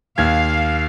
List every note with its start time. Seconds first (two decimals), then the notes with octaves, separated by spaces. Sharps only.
0.18 D#2 F5 G#6